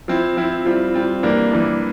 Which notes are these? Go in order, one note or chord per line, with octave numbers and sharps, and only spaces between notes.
F3 C4 E4
F3 C4 E4
G3 C4 F4
G3 C4 F4
E3 G3 A#3 D4
E3 G3 A#3 D4